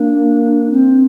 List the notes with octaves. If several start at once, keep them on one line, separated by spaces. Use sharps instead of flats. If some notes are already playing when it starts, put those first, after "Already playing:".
Already playing: A#3 D4
C4